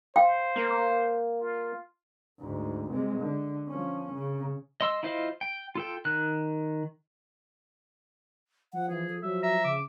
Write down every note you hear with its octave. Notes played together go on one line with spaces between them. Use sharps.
C5 F5 G5
A#3
F4
D2 G#2
C3 G#3
D3
F3 C#4
C#3
D#5 C6 E6
E4 F4 C5 D#5 F5
G5
F4 A4 G5
D#3 F#6
F3 F#5
E3 G#4
A4
F3 F#3 E5
E5 A#5
C#3 D6